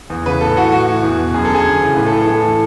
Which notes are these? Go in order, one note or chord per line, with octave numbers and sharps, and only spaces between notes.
E2
C#3 E3 B4
A2 A4
E3 F#4
A2 F#4
E3
E2
B2
F#2 G#4
D3 A4
G#4
F#2
C#3 E3
A2 B4
A4
E3 G#4
A2 A4
E3